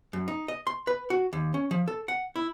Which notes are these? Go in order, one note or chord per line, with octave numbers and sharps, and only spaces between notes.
F#2
D#4
D#5
C6
B4
F#4
D#2
C#4
F3
A4
F#5
E4